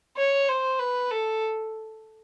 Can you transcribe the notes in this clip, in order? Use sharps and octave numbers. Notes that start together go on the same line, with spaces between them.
C#5
C5
B4
A4